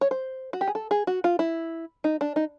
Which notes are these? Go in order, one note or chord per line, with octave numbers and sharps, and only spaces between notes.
C#5
C5
F#4
G4
G#4
A4
G#4
F#4
F4
E4
D#4
D4
D#4